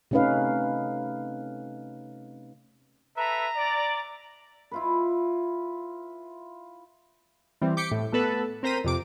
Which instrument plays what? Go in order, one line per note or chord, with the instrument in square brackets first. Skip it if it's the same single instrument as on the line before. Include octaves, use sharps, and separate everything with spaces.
[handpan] C3 A3 C#4 D#4 B4 F5
[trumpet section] A4 B4 E5 [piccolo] A#5
[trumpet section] D5
[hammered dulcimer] E4 F4 B4
[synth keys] E3 G3 C4
D6 G6 B6 C#7
A2
A3 B3 A4 B4
C4 A#4 C5 A#5 B6 D#7
F2 C3 D6